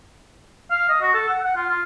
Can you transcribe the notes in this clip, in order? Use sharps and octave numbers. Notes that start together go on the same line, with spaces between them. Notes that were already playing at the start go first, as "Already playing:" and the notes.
F5
D#5
F#4
A4
F#5
F#5
F4
F4